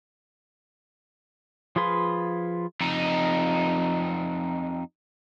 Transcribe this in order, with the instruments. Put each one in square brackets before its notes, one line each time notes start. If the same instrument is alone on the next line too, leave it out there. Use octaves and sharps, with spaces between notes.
[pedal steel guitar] F3 F4 G#4 B4 C6
[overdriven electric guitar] F2 D#4